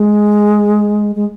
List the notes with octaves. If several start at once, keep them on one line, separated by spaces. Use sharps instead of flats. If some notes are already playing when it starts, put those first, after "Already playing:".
Already playing: G#3
G#3